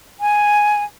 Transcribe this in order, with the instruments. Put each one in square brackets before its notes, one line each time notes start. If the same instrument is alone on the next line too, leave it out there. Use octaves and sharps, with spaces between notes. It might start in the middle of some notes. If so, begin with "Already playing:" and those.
[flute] G#5